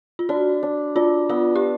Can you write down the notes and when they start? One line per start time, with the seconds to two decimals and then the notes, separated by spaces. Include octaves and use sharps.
0.19 F4
0.29 D4 F#4
0.63 D4
0.96 D4 F4
1.29 B3 F4
1.56 G4